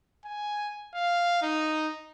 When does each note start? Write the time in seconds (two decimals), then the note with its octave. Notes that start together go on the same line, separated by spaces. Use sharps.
0.24 G#5
0.94 F5
1.42 D#4